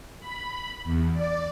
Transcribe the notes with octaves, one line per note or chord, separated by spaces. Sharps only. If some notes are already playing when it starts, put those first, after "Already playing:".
B5
E2
D5